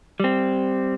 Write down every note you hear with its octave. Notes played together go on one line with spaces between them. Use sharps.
G3 C4